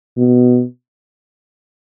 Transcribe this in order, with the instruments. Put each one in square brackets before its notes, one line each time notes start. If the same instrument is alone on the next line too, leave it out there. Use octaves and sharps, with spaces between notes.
[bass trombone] B2